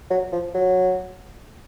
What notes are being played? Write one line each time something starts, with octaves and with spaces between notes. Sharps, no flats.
F#3
F3
F#3